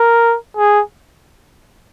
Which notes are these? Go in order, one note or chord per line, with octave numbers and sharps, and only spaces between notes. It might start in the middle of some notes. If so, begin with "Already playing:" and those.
Already playing: A#4
G#4